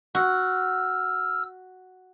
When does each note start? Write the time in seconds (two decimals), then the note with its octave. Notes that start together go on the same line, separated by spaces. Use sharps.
0.15 F#4 E6 F6